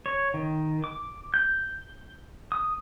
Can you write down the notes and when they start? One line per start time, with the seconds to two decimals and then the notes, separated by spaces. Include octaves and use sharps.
0.06 C#5
0.34 D#3
0.84 D6
1.34 G6
2.52 D#6